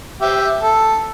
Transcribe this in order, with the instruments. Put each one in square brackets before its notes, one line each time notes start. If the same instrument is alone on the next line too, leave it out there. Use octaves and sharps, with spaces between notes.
[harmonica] G4 E5
A4